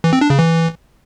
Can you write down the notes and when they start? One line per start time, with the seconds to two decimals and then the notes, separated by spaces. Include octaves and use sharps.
0.04 E3
0.13 C4
0.21 D4
0.30 C#3
0.39 E3